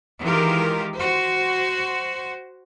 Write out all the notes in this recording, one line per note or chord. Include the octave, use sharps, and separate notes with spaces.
D#3 E3 G#3 F4 G4 A#4
F#4 C5